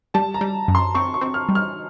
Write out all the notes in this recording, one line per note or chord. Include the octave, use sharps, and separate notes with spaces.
G3 A5
A#5
G3
F#2
C6
C4 C#6
C#6
C4
F6
G3
F6